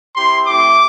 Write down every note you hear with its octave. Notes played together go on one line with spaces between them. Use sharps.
C4 E4 G4 C6
A3 C4 E4 G4 D6